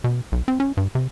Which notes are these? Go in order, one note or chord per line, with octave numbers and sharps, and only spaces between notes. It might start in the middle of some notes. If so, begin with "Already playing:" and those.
B2
B1
C4
C#4
G2
C3